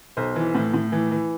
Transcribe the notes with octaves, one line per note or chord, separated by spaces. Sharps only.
B1 C5
E3
A2
A2
E3
E3